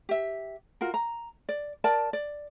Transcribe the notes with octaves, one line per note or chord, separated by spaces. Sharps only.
G4 E5
F4 F#4 A#4
A#5
D5
A#4 D5 A5
D5